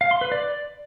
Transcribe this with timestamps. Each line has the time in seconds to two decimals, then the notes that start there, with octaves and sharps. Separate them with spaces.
0.01 F5
0.11 C6
0.21 B4
0.32 D5